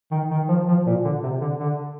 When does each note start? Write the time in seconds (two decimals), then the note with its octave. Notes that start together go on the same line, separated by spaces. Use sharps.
0.11 D#3
0.31 D#3
0.48 F3
0.68 F3
0.86 A#2
1.04 D3
1.23 C3
1.41 D3
1.60 D3